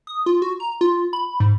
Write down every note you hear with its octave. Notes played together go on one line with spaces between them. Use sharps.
D#6
F4
F#4
A#5
F4
B5
G#2